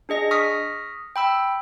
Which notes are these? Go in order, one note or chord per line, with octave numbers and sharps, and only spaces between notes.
D4 G#4 D#5 A#6
C#6 D#6 F6 A#6 B6
G5 B5 E6